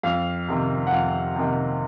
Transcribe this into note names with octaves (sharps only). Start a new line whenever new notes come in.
F2 F5
C3 D#3
F#5
F2 F5
C3 D#3